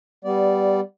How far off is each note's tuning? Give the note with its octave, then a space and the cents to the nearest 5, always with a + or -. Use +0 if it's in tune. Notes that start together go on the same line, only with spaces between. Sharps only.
G3 +0 B3 +0 D5 -10